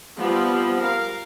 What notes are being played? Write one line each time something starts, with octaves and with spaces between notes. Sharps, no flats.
F3 G3 B3 C4
A#4 F5